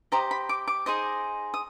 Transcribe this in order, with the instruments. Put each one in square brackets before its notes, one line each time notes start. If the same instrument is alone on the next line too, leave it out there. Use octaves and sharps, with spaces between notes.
[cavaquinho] G4 C5 D#5 A#5
B5
D6
D6
D#4 G#4 C5 D#5
D#6